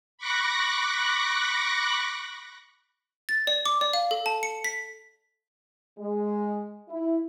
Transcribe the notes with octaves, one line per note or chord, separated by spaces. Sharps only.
B5 C#6 D6 F#6 A#6
A6
D5
D6
D5
F5
A4
A5
C#7
B6
G#3
E4